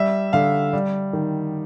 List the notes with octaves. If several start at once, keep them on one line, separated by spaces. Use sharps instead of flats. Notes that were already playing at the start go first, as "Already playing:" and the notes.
Already playing: G3 E5
D3 F5
G3
D#3